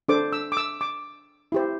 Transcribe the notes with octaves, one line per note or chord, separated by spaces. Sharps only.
D4 A4 C5 D6
E6
D6
E6
D6
E4 G4 C5